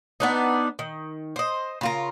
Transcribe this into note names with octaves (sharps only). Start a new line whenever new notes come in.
B3 D4 D#4
D#3
C5 D#5
C#3 F4 A#4